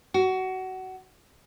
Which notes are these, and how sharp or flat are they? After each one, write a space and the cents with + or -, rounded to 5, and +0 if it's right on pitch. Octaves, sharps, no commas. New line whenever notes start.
F#4 +20